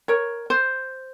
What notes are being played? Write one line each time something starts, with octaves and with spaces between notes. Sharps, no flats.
A#4 C#5
C5